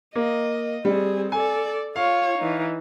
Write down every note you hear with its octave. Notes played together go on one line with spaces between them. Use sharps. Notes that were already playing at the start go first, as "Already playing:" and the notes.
A#3 D#5
G3 C4 G#4
A4 D5 G#5
F4 C#5 F5
E3 D#4